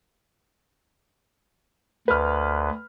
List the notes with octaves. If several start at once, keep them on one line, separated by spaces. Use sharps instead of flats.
D2 B4 B5 F6